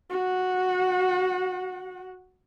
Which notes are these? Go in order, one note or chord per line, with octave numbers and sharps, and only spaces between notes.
F#4 F#5